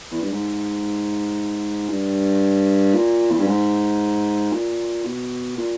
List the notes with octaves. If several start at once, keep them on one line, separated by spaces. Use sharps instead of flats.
E2
G2
G#2
G2
A#2
E2
G2
G#2
A#2
B2
A#2